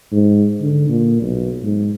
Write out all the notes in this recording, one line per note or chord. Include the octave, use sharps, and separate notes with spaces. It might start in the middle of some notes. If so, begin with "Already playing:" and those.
G#2
D3
A#2
B1
G#2